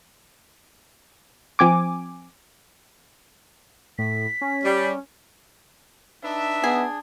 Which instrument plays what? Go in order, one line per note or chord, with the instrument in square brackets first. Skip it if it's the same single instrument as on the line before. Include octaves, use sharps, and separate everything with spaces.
[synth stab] F3 C4 G#5 D6
[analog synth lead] A2 [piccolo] B6
[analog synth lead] C#4
[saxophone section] G3
[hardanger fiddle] D4 [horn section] D#4 B4 E5
[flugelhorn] B3 [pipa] G#4